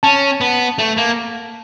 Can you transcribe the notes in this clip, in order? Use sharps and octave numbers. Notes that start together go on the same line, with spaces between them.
C#4 A5
B3
A3
A#3